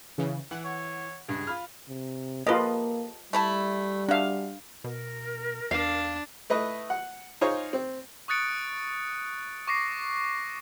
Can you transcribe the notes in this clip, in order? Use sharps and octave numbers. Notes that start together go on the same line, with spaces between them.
C#3 E3
E3 F#5
C#5
C#2 G2 G#4
F4 B5 F6
C3
A#3 F4 G4 A4 B4 D#5
G3 A3 E4 A5
D4 F#4 E5 F5
B2 A#4
E2 D4 F5 A5
A3 E4 B4 D#5 E5
F#5
D#4 F4 G#4 C5 C#5
C4
C#6 D#6 F#6 A6 C#7 D7
C#6 D6 A#6 C7